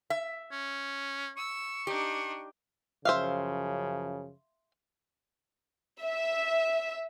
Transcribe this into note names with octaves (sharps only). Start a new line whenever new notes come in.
E5
C#4
C#6 E6
D4 D#4 G4
F#2 C#3 F3 C5 E5 F5
E5